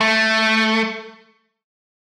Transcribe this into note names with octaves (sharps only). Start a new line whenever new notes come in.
A3